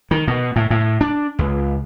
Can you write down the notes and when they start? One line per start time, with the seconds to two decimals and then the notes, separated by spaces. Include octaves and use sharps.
0.11 D#3
0.28 B2
0.56 A2
0.70 A2
1.01 D4
1.39 C#2